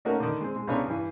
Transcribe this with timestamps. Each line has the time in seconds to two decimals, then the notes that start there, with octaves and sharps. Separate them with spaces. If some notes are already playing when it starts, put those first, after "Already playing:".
0.05 A3 A#3 C#4 D#4 F#4 A#4
0.20 D3 D#3
0.41 G#3 C4
0.56 G#3
0.67 C2 C#3 B3 D4 C#5 A#5
0.87 G2 E3